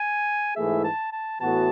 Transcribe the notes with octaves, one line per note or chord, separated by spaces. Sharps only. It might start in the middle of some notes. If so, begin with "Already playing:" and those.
Already playing: G#5
G#2 E3 A3 E4 G#4 E5
A5
A5
A2 E3 B3 F#4 A5